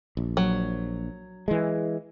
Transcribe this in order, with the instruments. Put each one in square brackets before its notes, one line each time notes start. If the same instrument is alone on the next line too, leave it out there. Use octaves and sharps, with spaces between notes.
[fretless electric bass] A#1
[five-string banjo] F#3
[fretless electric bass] E3 G#3